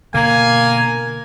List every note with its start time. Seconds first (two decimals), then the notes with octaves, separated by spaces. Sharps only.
0.14 B2 D3 A#3 G#5